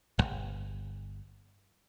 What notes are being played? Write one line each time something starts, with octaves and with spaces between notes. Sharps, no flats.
D1 G1